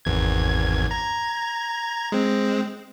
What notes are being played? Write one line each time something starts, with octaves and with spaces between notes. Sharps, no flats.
G#1 E2 G#6
A#5 G#6
G#3 C4